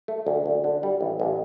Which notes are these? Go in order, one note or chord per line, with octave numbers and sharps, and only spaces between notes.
A3
D2
D2
D3
G3
A1
A1